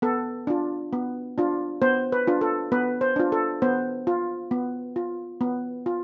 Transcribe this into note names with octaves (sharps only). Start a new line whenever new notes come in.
B3 A4
D4 F4
B3
D4 F4
B3 C5
B4
D4 F4
A4
B3 B4
C5
D4 F4
A4
B3 C5
F4
B3
F4
B3
F4